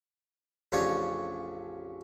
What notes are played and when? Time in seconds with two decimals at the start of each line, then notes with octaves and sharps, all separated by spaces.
0.72 A1 F2 C#3 D4 C#5